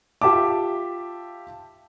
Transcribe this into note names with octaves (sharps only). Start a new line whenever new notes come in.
F4 G4 E5 A5 D6